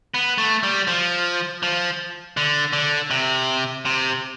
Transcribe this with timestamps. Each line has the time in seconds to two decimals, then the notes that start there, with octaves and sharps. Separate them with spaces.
0.14 B3
0.38 A3
0.63 G3
0.88 F3
1.63 F3
2.37 D3
2.73 D3
3.11 C3
3.85 C3